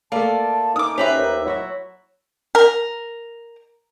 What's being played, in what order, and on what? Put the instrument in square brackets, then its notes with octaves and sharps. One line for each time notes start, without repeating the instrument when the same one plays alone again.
[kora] A3 A#3 [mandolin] F4 D5 [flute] A5
[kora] C#4 [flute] D#4 [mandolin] D6 D#6
[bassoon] C#4 [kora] F#4 C5 [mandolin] G4 B4 E5
[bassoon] D#2
[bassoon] F#3 [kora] E4 F#4 E5
[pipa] A#4